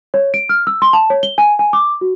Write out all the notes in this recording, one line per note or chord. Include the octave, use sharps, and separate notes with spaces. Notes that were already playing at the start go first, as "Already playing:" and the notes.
C#5
D7
F6
E6
C6
A5
C#5
G7
G#5
G#5
D6
F#4